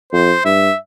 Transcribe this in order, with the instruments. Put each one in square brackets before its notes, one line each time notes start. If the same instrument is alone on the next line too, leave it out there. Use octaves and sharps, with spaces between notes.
[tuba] F2 [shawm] C5
[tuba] G2 [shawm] E5